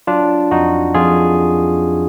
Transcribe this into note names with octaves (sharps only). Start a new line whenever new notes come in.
F#3 D4 F4
F2 D#4 F#4
F2 F4 G#4